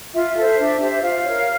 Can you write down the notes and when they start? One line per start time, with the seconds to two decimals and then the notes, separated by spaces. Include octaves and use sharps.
0.14 F4 E5
0.36 A4 C5
0.58 D4
0.81 G4 C5
1.02 F4 F5
1.24 A#4 C#5